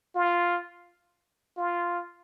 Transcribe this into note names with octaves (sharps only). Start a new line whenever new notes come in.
F4
F4